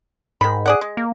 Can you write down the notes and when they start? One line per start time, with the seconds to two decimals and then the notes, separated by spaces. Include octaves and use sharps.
0.41 G#2 D#3 B5
0.66 G#4 D5 F#5
0.81 G#3
0.97 A#3